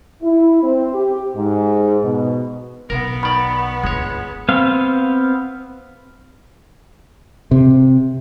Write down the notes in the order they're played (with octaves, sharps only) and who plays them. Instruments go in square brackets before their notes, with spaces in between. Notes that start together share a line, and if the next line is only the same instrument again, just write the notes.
[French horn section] E4
C4
G4
G#2
B2
[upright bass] B1 [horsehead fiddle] B3 [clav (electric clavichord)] A#4
[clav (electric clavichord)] D#3 D5 [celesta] B5
[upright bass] G1 D2 [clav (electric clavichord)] G#3 C#5
[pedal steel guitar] B3 C4 F5
[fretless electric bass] C3